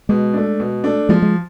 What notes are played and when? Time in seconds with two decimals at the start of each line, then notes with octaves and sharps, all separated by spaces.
0.09 B2 G#3
0.34 A3 D4
0.60 B2
0.84 A3 D4
1.09 F3 G#3
1.22 G#3